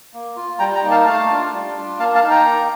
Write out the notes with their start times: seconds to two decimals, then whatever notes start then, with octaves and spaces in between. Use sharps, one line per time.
0.13 A#3
0.36 F4
0.59 G3 G5 A#5
0.75 G5 A#5
0.82 A#3 D#4
0.90 F5 A5
1.06 A3 F5 A5
1.30 D4 F4
1.53 G3
1.76 D4 F4
1.99 A#3 F5 A5
2.15 F5 A5
2.23 D#4
2.30 G5 A#5
2.45 A#3